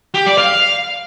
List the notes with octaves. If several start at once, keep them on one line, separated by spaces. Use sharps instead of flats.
G4
D5
F5